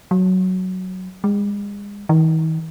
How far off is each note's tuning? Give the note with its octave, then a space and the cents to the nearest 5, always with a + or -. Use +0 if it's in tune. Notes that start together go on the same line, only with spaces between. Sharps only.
F#3 +5
G#3 -35
D#3 +45